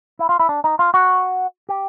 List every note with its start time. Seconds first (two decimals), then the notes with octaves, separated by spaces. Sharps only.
0.19 E4
0.29 F4
0.39 E4
0.49 D4
0.64 D#4
0.79 F4
0.94 F#4
1.69 G4